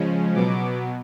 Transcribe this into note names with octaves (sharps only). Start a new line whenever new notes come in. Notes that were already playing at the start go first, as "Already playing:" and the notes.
Already playing: C#3 F3 G#3 C#4
B2 F#3 B3 D6